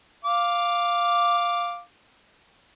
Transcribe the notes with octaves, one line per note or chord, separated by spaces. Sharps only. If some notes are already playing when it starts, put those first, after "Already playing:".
F5 D6